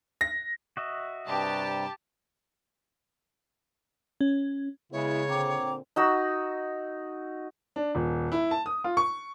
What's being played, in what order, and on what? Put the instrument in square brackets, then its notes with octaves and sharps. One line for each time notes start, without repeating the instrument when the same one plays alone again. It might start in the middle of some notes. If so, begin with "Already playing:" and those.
[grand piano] A#6
[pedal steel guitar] F#4 D#5 E5
[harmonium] G2 C3 G3 [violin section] G4 A5
[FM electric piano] C#4
[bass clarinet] C#3 [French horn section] G#3 B3 E4 [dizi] C#5
[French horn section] A#2 D3 C4 [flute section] G5 A#5 D6
[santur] D#4 F#4 E6
[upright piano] D4
D#1
E4
A5
D#6
F4
C#6